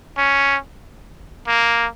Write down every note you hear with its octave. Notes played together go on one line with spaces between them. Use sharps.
C#4
A#3